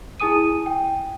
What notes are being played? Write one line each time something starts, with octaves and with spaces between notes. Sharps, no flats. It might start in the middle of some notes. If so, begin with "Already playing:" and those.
E4 G#4 G#5 D#6 D#7
G5